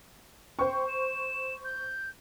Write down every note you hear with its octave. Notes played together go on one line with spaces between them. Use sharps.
C5 G5 C#6
E7
G6